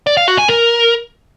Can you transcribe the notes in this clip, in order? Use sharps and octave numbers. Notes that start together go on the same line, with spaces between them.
D5
F5
F#4
G#5
A#4